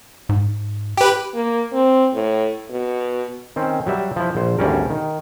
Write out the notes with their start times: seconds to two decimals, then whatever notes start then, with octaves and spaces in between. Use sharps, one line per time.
0.29 G#2
0.97 G4 B4
1.35 A#3
1.73 C4
2.15 A2
2.70 B2
3.56 D#3 C4 C#4
3.86 F#3 G3 E5
4.16 F3 E4
4.35 A#1 C5
4.58 G#1 D2 G3 C#4 A#4
4.90 D#3